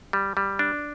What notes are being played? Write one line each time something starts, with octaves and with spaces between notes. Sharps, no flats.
G3
G3
D4